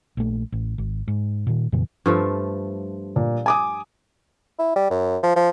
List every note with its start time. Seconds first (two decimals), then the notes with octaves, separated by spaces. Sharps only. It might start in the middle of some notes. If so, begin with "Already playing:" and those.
0.17 A#1 A3
0.52 A1
0.78 G#1
1.08 G#2
1.47 A#2 D#3
1.72 F2 A#2 C#3 E3
2.06 G2 F3 A3
3.16 A#2
3.46 G#5 D6 D#6
4.59 E4
4.76 G3
4.90 F#2
5.23 F3
5.36 F3